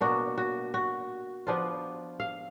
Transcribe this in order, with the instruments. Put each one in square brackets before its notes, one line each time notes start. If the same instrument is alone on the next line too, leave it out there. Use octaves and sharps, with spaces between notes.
[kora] B2 A#3 D4 F#4
F#4
F#4
F3 B3 D4 F4
F5